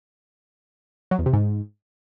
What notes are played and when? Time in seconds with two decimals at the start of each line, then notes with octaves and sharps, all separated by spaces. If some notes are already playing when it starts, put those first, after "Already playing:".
1.11 F#3
1.19 E2
1.26 C3
1.33 G#2